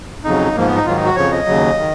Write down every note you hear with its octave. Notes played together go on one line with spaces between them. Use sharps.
F2 C#3 F#3 D#4
G#2 F3 A#3
B3
D#4
G#2 D#3 F#3 F4
D#4
F#4
F2 C#3 F3 C#5
D#5
D#2 C#3 F#3
D#3